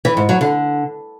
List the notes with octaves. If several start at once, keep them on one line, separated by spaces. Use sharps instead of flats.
E3
G#2
F#3
D3